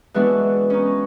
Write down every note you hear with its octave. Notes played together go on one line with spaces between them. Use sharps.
E3 G#3 B3 D4 E4 F#4
C#4 D#4